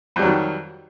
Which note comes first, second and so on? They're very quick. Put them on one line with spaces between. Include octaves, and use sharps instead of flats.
F2 G3 F#3 D#3